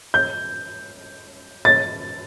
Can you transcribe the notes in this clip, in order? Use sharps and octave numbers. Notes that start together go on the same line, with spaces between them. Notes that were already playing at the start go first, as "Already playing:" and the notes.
G6
A6